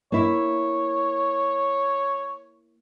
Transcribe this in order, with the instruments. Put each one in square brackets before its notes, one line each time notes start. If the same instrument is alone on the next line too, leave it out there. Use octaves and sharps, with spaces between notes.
[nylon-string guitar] A#3 E4 [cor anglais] C#5